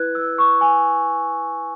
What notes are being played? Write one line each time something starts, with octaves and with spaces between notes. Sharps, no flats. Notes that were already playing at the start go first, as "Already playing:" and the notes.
Already playing: E4 B4 F#6 G#6
E6
C#6
G#5